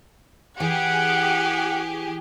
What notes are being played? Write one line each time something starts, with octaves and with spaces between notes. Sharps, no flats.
E3 G4 G#4 F#5